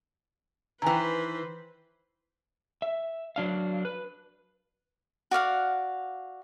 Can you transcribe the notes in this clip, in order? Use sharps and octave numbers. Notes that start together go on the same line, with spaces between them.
D#3 E3 B4 C5 G5 G#5 A#5
E5
F#3 D4 F5
B4
F#4 D5 F5 F#5